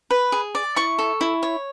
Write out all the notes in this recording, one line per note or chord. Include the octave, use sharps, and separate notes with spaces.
B4
G#4
D5
E4 C#6
A4
E4
C#5